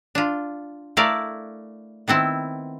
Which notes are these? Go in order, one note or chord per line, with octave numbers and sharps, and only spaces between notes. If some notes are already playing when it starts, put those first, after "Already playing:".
D4 F4
A3 E4 A#4 D5 F5
D#3 B3 C4 E4